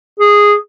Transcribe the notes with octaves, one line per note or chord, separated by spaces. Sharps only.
G#4